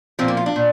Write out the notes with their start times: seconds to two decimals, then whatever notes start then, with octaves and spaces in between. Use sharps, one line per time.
0.19 A#2 F3 C4
0.28 A#3
0.37 F4
0.46 D4
0.56 A#2